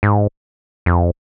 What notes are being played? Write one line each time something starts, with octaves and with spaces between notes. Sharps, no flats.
G#2
F2